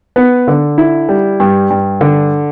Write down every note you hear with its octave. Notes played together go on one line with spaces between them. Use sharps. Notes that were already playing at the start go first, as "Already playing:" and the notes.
B3
D3
E4
G3
G2
G2
D3